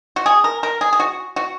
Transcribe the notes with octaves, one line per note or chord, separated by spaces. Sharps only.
F#4
G#4
A#4
A#4
G#4
G#4
F#4
F#4